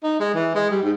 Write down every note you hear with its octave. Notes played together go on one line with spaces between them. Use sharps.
D#4
G#3
E3
G#3
G3
G#2